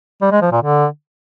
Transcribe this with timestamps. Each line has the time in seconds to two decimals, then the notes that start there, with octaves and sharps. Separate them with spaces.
0.22 G3
0.32 G#3
0.42 F3
0.52 A#2
0.62 D3